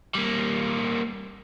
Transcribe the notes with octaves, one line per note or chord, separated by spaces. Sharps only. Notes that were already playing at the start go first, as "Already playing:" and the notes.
G3 A#3